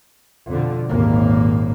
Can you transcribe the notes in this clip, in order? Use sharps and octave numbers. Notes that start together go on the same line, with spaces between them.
F2 B2 D3
G#1 D#2 A#2 A#3